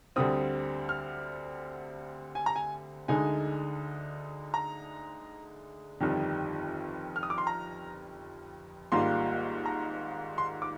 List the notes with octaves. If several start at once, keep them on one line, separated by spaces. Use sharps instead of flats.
D2 D3 G3 C4 D#6
F6
G#5
A#5
G#5
D2 D3 G#3 D#4 G#5
A#5
G1 F2 D#3 G3
F6
D#6
D6
C6
A#5
G#1 G#2 G3 A#3 F4 C6
A#5
C6
D6